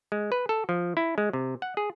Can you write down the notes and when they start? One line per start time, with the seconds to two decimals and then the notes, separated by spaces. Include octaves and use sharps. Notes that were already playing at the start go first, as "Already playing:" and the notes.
0.12 G#3
0.32 B4
0.49 A4
0.69 F3
0.97 E4
1.18 G#3
1.33 C3
1.62 F#5
1.77 G#4